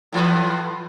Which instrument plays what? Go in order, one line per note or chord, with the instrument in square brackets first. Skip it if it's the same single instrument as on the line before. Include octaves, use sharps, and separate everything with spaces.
[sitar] A2 E3 B4